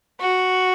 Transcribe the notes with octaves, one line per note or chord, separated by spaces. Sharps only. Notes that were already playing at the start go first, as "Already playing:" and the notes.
F#4